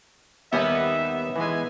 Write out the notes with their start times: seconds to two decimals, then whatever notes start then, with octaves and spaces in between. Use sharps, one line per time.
0.53 D#2 G3 B3 D#4 E5 G#5
1.36 E3 G#3 B3 G#5